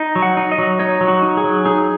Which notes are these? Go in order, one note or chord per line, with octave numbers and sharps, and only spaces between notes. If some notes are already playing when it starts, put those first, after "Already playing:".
Already playing: D#4
F#3
F#5
D#4
D#5
F#3
D#4 C#5
F#3
F#4
D#4
G#4
F#3
D#4 G#4